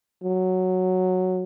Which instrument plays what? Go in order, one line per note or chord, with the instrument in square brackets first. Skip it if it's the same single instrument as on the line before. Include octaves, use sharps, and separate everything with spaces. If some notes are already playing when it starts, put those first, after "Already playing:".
[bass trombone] F#3